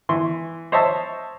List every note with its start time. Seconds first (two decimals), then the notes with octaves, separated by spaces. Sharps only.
0.09 E3 C6
0.72 C5 C#5 D#5 E5 A5